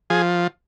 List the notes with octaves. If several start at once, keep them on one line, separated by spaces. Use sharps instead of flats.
F3 G#4